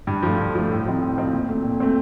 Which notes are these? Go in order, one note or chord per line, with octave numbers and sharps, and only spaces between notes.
G2
F3 A3
G2
F3 A3
A2
F3 C4 D#4
A2
F3 C4 D#4
A#2
A3 C4
A#2
A3 C4